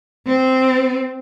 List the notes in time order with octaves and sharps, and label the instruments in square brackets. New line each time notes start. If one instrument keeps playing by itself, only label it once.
[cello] C4